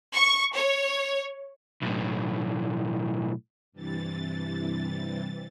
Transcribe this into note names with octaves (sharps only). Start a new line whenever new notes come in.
C#6
C#5
B1 A2
G2 C3 E3 A6